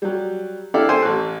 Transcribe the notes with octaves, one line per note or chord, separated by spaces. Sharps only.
F#3 G3
D4 E4 G4 A4 D5 F5
A4 C5 G5 G#5 C6
A1 F#6